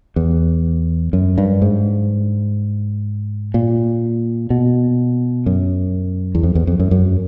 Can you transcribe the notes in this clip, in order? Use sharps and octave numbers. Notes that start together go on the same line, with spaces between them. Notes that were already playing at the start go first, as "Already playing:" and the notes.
E2
F#2
G2
G#2
A#2
B2
F#2
E2
F2
E2
F2
F#2
F#2